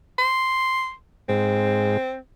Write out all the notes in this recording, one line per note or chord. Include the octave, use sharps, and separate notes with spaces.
C6
G#2 C4